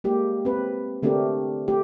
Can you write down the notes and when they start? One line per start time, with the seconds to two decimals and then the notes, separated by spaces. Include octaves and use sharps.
0.04 G#3 A#3 G4
0.45 C4 B4
1.03 D3 A3 C4 D4 G4 A#4
1.68 A3 G4